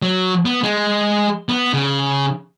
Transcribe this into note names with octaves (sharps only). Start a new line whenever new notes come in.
F#3
B3
G#3
B3
C#3